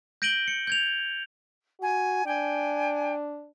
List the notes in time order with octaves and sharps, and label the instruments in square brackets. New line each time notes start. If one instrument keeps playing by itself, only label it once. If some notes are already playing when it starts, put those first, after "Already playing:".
[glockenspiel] G6 A#6 D7 D#7 F#7 G7
C#7
G6 G#6 F7
[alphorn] F#4 [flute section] G#5
[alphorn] D4 [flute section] G5 G#5